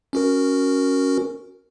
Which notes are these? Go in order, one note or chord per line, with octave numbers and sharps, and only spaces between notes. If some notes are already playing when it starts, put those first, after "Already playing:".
C#4 F#4 A#4